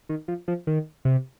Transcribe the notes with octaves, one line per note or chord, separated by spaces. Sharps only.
D#3
F3
F3
D#3
C3